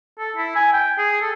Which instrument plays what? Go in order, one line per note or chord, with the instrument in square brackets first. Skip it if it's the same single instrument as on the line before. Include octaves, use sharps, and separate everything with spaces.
[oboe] A4
E4
G#5
G5
G#4
A4